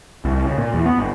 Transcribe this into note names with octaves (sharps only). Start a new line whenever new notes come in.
C2
C#3
A#2
E2
B3
G1